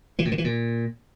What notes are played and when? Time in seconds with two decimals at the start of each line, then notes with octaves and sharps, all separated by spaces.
0.19 E3
0.25 A2
0.32 D3
0.38 E3
0.44 A#2